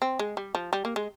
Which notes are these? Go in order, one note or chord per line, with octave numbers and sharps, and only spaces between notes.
C4
G#3
G3
F3
G3
A#3
G#3